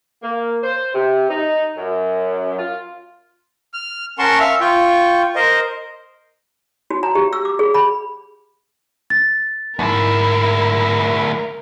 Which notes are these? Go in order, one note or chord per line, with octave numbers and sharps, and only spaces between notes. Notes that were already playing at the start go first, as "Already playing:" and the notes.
A#3
C5
C3
D#4
F#2
F4
F6
C#4 A#4 F#5 A5 C6 C#6
E5 F5 F6
F4 G5 C#6
A#4 C5 D#5
F#4
A#5
G4
E6
D6
G#4
B5
A6
D2 G#2 E4 A#4